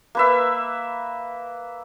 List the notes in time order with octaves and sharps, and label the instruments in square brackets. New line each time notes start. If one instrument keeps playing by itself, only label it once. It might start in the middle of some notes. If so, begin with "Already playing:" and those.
[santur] A#3 B4 E5